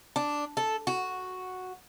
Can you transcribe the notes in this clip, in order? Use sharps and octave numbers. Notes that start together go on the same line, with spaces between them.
D4
A4
F#4